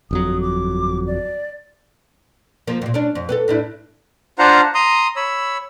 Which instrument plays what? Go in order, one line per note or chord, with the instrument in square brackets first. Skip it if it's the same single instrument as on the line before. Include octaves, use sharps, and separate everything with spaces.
[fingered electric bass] G1 F2 F#3 [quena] D#6
[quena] D6
D5
[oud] F3 A#3
F2 A#2
C#4 D4
F2
B3 C4 A4
A2 D4 E4
[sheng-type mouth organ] D4 F4 C5 F5 F#5 A#5
A#5 C6 D#6
C#5 B5 E6